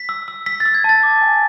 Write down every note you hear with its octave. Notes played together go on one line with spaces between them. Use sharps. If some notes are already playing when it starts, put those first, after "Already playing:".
Already playing: B6
E6
E6
E6 B6
A6
E6
G#6
A5 A6
D6
G#5